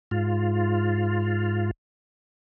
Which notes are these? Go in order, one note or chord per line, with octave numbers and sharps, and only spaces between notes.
G#2 F4